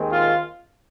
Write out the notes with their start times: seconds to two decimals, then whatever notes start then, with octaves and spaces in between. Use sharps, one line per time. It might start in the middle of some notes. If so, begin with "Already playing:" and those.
Already playing: D#2 D#3 G#3 C4
0.12 F4